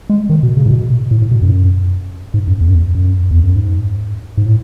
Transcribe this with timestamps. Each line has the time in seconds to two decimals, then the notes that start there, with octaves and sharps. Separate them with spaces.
0.10 G#3
0.29 D#3
0.43 B2
0.57 C#3
0.66 A2
0.71 B2
1.11 A2
1.22 A2
1.31 B2
1.42 F#2
2.34 G#2
2.47 F#2
2.61 E2
2.68 F#2
2.75 E2
2.95 F#2
3.31 E2
3.43 F#2
3.56 G#2
4.38 G#2
4.46 A2